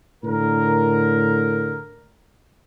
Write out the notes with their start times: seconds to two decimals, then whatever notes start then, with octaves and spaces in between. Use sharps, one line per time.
0.24 A2 D3 A#4